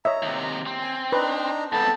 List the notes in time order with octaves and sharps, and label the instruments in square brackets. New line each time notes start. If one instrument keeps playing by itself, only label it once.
[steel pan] C#5 D#5 E5 [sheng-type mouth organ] A#5
[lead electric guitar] D#2 C3
C4
[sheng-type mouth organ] G#5
[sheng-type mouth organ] D4 D#4 A#5 [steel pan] B4
[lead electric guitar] G#2 C4 [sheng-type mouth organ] B3 A4 B5 [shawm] A5